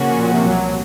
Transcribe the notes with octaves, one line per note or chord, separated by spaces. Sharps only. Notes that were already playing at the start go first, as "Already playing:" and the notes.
Already playing: C#3 F3 A#3 C#4 F#4
A#2
C3
C2 A#2 F3 F#3